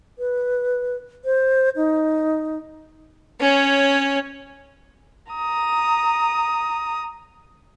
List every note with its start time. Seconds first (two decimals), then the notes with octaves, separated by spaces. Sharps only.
0.19 B4
1.25 C5
1.76 D#4
3.41 C#4 C#5
5.32 A#5 D#6